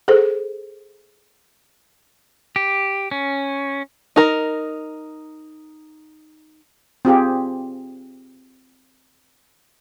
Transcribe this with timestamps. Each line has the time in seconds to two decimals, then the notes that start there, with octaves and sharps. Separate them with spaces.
0.08 G#4 A4 C5
2.56 G4
3.11 C#4
4.16 D#4 A#4
7.05 C4 F4 G4 G#4